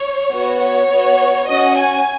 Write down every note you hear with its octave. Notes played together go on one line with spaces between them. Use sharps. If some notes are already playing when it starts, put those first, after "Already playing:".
Already playing: C#5
B3 F#4
C#5
B3 F#4
C#4 F#4 D#5
G#5